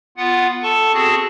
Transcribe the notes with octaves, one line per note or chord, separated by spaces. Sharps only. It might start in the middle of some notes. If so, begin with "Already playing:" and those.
B3 F4 F#5
A4 A5 C#6
C4 F#4 G#4 A5